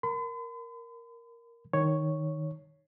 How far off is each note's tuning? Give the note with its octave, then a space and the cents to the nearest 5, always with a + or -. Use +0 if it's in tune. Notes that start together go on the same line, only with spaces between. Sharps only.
A#4 +0 B5 +45
D#3 +0 C#5 +0